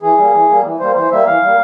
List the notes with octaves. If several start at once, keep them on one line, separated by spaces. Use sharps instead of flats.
E3 G#4
G3 A#3
E3
G3 A#3
E3
G3 A#3 C5
E3 C5
G3 A#3 E5
E3 F5
G3 A#3